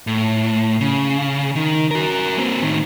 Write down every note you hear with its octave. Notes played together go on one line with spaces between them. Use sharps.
A2
C#3
D#3
F#4 A#4
A#3 C4
A2 D#3